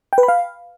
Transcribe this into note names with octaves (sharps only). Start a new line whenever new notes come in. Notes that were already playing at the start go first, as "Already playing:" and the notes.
G5
B4
B5
F5